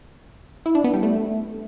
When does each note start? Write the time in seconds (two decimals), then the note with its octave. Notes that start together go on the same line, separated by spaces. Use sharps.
0.66 E4
0.75 D4
0.84 B3
0.94 G3
1.03 A3